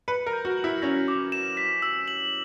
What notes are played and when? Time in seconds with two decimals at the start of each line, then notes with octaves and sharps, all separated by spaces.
0.08 B4 C#7
0.26 A#4
0.33 G6
0.45 F#4
0.57 F#7
0.64 E4
0.82 C#4 A#6
1.08 D6
1.32 E7
1.57 B6
1.82 E6
2.08 F#7